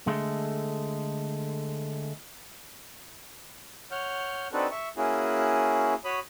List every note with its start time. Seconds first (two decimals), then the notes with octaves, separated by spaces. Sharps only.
0.07 D3 G#3 A3
3.91 C#5 F#5 F6 G6
4.53 C4 D4 D#4 F#4 A4 B4
4.71 E5 C#6
4.97 A#3 C#4 E4 F#4 G#4
6.05 F#4 C#5 B5 D#6